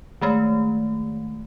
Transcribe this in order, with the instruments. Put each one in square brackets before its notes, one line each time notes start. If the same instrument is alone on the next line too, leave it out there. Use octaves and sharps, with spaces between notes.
[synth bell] D#3 G#3 A3